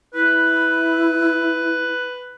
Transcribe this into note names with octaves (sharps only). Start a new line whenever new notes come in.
E4 B4